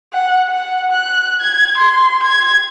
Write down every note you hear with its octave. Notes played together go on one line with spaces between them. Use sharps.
F#5
F#5
F#6
G#6
C6
G#6